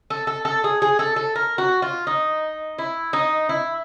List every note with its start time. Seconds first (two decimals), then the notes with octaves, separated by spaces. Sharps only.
0.10 A4
0.27 A4
0.45 A4
0.64 G#4
0.82 G#4
0.99 A4
1.16 A4
1.35 A#4
1.58 F#4
1.82 F4
2.07 D#4
2.78 E4
3.13 D#4
3.49 E4